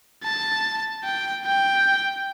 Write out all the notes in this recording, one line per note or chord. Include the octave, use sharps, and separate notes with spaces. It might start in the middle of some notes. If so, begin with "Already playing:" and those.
A5
G5
G5